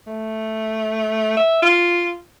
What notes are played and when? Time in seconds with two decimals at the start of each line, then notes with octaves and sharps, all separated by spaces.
0.07 A3
1.37 E5
1.62 F4